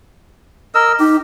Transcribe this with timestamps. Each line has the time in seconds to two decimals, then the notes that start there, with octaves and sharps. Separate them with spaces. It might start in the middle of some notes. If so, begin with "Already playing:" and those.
0.75 A#4 D#5 E6
0.99 D#4 G4